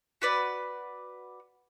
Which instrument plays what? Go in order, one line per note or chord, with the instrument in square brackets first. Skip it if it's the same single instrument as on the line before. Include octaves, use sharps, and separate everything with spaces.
[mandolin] F#4 B4 D5